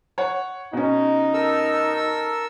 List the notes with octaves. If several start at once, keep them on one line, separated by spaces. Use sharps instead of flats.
C#5 F#5
B2 C#4 D#4
A4 A#4 E6